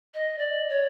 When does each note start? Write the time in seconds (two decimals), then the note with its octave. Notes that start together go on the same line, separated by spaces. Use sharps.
0.14 D#5
0.38 D5
0.69 C#5